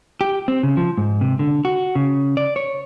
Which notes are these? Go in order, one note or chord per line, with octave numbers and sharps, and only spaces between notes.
G4
C4
C#3
F3
G#2
C3
D3
F#4
C#3
D5
C#5